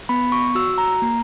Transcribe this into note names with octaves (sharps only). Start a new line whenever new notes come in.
B3 B5
C#6
F#4 E6
A#5
A#3